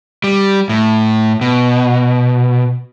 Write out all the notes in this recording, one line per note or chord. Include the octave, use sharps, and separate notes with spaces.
G3
A2
B2